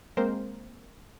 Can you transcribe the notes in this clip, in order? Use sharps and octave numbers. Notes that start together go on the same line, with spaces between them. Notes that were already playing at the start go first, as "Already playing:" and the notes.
G#3 A#3 C4 A#4 C5